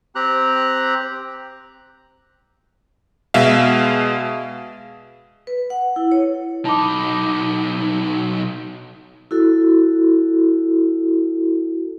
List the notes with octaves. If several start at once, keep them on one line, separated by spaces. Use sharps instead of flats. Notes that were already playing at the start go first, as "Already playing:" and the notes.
C4 G4 A#5 F#6
B2 G#3 E5 F5
B4
F#5
E4
C#5
B1 D#4 A5 B5 D6
E4 F#4 A4